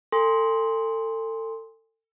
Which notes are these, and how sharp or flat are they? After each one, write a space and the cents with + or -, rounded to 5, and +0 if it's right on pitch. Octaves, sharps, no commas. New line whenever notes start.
A4 +30 G#5 -35 C6 +0